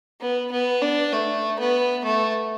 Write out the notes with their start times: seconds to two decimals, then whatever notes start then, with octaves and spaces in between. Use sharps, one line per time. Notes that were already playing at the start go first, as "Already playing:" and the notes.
0.21 B3
0.52 B3
0.82 D4
1.13 A3
1.59 B3
2.05 A3